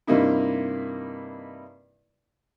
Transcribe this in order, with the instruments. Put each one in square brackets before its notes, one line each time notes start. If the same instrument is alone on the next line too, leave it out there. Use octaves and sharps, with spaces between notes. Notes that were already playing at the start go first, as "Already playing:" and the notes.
[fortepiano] G2 C3 A#3 D#4 E4